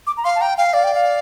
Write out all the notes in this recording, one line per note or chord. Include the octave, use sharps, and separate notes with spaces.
D6
A#5
F5 C6
A5
G5 A#5
F5 G5
D5 F5
G5
F5